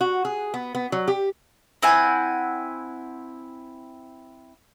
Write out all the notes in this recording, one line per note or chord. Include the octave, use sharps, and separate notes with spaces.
F#4
G#4
B3
B3
F#3
G4
C4 E4 F#5 G#5